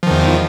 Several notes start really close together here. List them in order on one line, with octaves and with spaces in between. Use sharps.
F3 D#3 E2